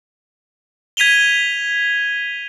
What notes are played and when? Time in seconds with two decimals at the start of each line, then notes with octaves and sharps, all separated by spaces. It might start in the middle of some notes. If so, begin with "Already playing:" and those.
0.97 G#6 B6 D#7 F7 G7